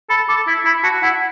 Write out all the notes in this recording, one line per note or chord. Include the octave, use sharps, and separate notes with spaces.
A4 B5
A4 D6
E4 E6
E4 B5
F#4 A5
E4 F#5